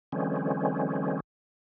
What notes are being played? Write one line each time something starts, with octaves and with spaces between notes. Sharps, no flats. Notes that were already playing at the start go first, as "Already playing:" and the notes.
D3 E3 F#3 G#3 C4 C#4